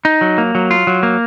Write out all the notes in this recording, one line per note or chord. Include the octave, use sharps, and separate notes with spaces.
D#4
F#3
A#3
F#3
F4
F#3
A#3